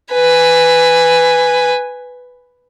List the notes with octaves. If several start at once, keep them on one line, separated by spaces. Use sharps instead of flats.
B4 G#5